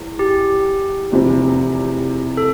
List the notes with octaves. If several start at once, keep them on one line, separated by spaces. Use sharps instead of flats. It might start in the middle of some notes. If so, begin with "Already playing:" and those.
Already playing: E2
G4
F1 E2 C3
A4